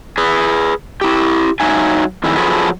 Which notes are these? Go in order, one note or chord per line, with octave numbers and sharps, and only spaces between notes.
G#4 B4
E4 G4
F#3 D#4 E5 G#5
F2 D#3 E4 G#4
F3 F#3 G#4 A4 B4